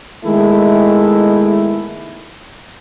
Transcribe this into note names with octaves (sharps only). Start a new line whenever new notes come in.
D#3 G#3 A3 B3 E4